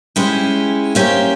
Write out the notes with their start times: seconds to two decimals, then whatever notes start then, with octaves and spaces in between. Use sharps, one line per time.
0.16 G#3 C#4 E4 G4
0.95 A#3 C#4 G4 C5 E5